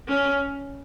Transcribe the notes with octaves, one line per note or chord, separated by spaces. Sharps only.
C#4